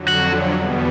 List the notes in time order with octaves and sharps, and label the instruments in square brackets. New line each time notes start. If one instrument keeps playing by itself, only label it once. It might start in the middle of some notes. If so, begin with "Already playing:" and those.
Already playing: [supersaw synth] F2 D3 F#3
[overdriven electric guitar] F#4
[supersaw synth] E2 B2 G3 B3